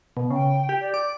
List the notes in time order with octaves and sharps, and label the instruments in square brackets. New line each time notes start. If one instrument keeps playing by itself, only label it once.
[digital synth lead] B2
[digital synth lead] C#3 [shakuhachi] G5
[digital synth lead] G4
[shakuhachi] D5
[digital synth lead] D6